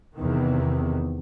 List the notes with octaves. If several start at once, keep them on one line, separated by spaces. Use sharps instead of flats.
E2 C3 D#3